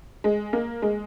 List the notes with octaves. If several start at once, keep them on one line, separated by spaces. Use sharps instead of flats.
G#3
A#3
G#3